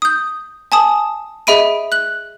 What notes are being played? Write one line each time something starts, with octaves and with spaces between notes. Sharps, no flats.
D#6 G6
G#5 A5 D#6
G#4 D#5 E5 B5 D7 D#7
F#6 F#7